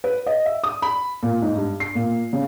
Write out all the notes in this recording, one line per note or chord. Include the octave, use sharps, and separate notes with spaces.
B4
D#5
E5
D#6
B5
A#2
G#2
G2
C7
A#2
C#3